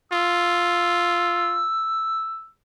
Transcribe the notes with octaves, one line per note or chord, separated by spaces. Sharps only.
F4 E6